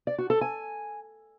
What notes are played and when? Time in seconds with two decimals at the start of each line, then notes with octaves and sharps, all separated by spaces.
0.07 D5
0.18 F#4
0.30 A4
0.41 G#5